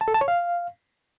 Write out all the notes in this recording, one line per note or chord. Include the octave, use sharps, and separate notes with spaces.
A5
A4
A5
C#5
F5